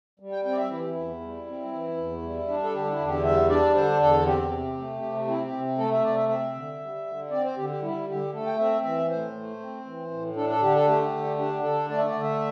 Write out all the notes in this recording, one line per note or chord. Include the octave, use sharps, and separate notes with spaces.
G3
G5
C4 G5
D5
E5
E3 E4
G4
E4
E2
G3
C4
E3
E2
G3
D4
A4
D3 G4
E4
E2
G4
G3 E5
D4 D5
D3 C5
E2 A4
C4 G4
C3
A3
C3
C4 E4
G4
C3
A3 A4
E5
C3 D5
E5
C4 E5
D3
G3
D3
C4 D5
C5
D3 G4
G4
G3 E4
D3 G4
A3 A4
G5
C4 E5
E3 E5
A2 C5
A3
C4
E3
A2
D4 A4
A4
D3 G4
A4
A3 G4
D3
D4 G4
D3 A4
A3 D5
E5
D5
D3
E5